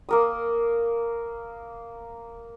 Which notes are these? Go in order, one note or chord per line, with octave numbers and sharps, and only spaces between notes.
A#3 A#4 D#6